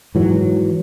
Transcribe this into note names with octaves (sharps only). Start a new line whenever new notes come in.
G#2 E3 F#3